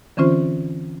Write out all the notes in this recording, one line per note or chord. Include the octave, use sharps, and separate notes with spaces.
D3 E3 C4 C#4 F4 C5